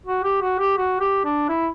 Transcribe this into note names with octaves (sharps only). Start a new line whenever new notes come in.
F#4
G4
F#4
G4
F#4
G4
D4
E4